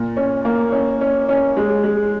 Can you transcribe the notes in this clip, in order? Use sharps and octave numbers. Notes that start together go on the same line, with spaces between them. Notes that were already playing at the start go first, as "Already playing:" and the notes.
Already playing: A#2
C#4
A#3
C#4
C#4
C#4
G#3
G#3